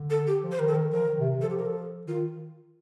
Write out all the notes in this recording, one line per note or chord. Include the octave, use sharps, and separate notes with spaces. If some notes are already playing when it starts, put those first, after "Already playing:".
Already playing: D3
A4
G4
F3
C5
D#3 A#4
A4
D#3 A#4
F3 A#4
D#3
C3
C3
F3 A4
G4
A#4
A4
D#3 F4